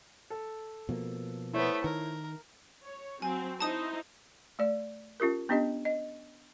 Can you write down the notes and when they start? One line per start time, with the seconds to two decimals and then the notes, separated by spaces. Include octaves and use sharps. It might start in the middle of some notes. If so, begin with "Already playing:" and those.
0.30 A4
0.89 B2 F3 A#3
1.53 A3 B3 E4 C5 C#5
1.84 D#3 A#4
2.85 C#5
3.22 F#3 C4 G#5
3.61 D#4 E4 C5 A5 D#6
4.59 A3 D5
5.20 C#4 F4 G4 A#4
5.49 B3 C#4 D4 G4 D#5
5.85 D#5